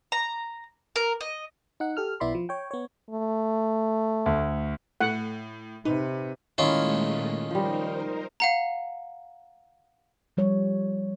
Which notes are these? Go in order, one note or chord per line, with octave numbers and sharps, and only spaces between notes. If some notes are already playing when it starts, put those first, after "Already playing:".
A#5
A#4
D#5
D#4 F#5
G4 A4 F6
B1 B3 E4 D5 B5 C6
F3
C#5 G5
B3 C#5
A3
D2
A2 A3 F#5
C3 D#4 B4
A#2 D#3 G#3 A3 C#4 E4 F4 F5
F3 G3 D#4 A#4 C5
F5 F#5 A#5
F3 G3 C#5